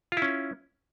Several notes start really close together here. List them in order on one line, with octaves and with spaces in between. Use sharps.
F4 E4 C#4